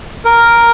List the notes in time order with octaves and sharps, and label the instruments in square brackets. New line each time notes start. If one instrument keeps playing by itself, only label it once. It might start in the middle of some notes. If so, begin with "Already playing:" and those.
[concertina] A#4